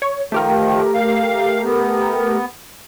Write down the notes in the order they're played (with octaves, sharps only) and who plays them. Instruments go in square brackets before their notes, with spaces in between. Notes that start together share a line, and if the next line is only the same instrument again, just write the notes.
[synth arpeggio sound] C#5
[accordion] D#3 F3 [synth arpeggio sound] A3 G4 A#4
[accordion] F5
B3